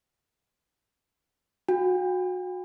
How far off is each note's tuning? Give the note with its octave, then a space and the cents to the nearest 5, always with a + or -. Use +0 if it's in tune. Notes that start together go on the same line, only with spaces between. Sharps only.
F#4 -25 G5 +40